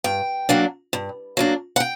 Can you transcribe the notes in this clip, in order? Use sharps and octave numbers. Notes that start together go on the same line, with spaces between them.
G2 G5
F#3 A#3 D4
G2
F#3 A#3 D4
F#5
G5